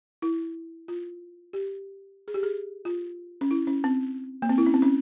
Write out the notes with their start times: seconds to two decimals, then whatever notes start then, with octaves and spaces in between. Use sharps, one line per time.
0.22 E4
0.88 F4
1.53 G4
2.28 G#4
2.34 G4
2.43 G#4
2.85 F4
3.41 C#4
3.51 E4
3.67 C#4
3.84 C4
4.42 A#3
4.49 C4
4.58 E4
4.66 C#4
4.74 C4
4.82 C#4